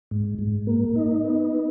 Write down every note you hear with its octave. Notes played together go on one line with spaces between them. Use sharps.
G#2
G#2
A#3
D#4
B3
D#4